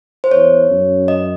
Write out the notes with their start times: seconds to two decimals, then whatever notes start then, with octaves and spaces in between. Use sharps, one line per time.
0.24 C5
0.31 E2 C#5
0.70 F#2
1.08 D#5